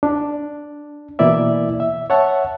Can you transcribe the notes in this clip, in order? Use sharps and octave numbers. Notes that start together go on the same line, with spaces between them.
D4
B2 E3 A#3 E4 D5 E5
E5
C#5 E5 F#5 A5